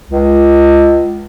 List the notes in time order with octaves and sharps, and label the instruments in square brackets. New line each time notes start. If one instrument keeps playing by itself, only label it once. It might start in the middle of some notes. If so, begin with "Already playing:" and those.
[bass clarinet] C#2